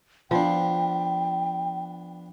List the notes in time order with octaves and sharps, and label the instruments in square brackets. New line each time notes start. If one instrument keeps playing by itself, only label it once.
[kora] F3 [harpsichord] B3 D4 [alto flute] G5